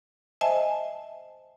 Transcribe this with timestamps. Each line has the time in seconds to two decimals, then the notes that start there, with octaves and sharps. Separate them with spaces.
0.41 C5 D#5 E5 G#5 A5